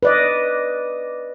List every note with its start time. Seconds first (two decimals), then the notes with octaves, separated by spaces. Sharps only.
0.03 B4 D5 D#5